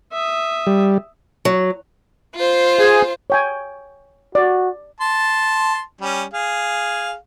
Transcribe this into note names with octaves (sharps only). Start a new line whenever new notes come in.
E5 D#6
G3
F#3
F4 C5
G#4 G#5
C#5 G5 G#5
F#4 D5
A5 C6
G3 C#4
G#4 F5